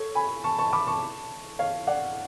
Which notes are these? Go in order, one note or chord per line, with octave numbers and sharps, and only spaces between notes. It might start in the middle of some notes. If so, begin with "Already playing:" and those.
Already playing: A4 C#5
G#5 B5
A5 C#6
A5 C#6
B5 D6
A5 C#6
C#5 F5
D5 F#5